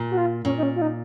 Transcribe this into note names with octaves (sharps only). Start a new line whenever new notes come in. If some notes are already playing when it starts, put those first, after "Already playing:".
Already playing: A#2
F#4
F4
A#2 C#4
D#4
C#4
F4
D#4